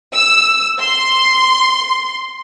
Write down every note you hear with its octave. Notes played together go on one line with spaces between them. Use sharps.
E6
C6